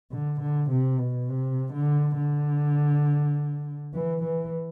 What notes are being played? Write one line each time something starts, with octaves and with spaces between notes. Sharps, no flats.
D3
D3
C3
B2
C3
D3
D3
E3
E3